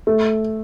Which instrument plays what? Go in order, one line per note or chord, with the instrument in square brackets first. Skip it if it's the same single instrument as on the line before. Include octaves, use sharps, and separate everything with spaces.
[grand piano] A3